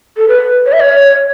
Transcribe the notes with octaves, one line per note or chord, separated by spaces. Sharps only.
A4
B4
C#5
E5
C#5